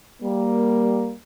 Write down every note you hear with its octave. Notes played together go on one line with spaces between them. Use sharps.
G3 A#3